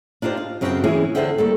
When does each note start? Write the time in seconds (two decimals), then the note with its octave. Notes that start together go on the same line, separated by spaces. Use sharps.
0.22 D4 D#4 F4 G4 C5
0.37 F5
0.61 F#2 C#3 C4 F#4 A#4 G5
0.84 E3 B3 C#4 E4 G#4
1.15 E2 D3 C5 E5 F#5 G5
1.38 G3 A#3 A4